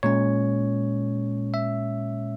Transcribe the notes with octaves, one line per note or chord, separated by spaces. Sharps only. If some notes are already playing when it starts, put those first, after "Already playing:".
A#2 G#3 C#4 C#5
E5